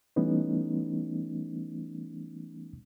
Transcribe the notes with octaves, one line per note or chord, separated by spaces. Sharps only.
E3 G3 A3 B3 C#4 D#4